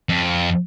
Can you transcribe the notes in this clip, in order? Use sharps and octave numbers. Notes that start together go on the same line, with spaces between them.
F2